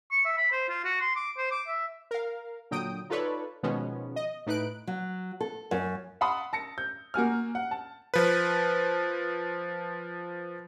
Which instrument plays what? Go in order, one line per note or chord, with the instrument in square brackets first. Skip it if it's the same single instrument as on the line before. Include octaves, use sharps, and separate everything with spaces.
[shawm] C#6
E5
B5
C5
F4
F#4
C6
D6
C5
D6
E5
[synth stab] A#4 F5
A#2 D3 F#3 G5 D#6 D7
D#4 F4 A4 B4 C#5 D5
B2 D#3 F3 G#3 B3 C#4
D#5
A2 D#4 B4 F#6 D7
[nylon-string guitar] F#3
A4
F#2
[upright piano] F5 F#5 A5 B5 C6 D#6
A5 A#6 C#7
G6
A#3 F#4 G#5 F6
F#5
A5
[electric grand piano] F3 B4